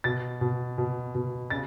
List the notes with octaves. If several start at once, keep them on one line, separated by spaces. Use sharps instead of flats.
B2 A6
B2
B2
B2
C#3 A6